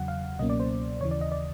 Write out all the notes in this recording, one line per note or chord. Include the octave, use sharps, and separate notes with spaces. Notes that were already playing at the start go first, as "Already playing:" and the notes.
Already playing: E2 C#3 F#3 F#5
F5
C#2 B2 F#3 A#3 C#4 D#5
D5
C5
D#2 C#3 E3 C#5
D5
D#5
D5